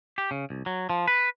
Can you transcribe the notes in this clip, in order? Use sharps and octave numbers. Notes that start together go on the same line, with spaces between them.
G4
C#3
C2
F#3
F3
B4